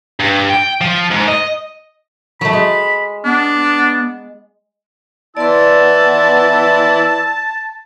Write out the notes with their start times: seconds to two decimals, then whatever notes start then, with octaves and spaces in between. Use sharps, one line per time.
0.20 G2
0.49 G5
0.81 F3
1.11 G#2
1.29 D#5
2.41 F#3 A3 B5
2.53 G#3
3.25 B3 D4
5.37 E3 B3 E4 D5 A5 C6 E6